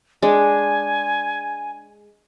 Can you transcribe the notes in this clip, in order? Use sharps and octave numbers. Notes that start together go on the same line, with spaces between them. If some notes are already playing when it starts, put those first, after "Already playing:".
G#3 D4 G#5